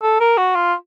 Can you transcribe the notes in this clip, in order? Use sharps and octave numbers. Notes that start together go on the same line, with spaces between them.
A4
A#4
F#4
F4